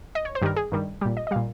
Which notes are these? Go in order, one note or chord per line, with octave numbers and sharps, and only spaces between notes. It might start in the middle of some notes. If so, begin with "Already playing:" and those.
D#5
C#5
C5
G2 D#3 G3 A#4
G#4
G2 D#3 G3
A#2 G3 G4
D#5
D#5
A#2 G3 F5